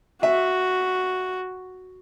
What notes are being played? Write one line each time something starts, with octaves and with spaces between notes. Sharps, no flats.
F#4 E5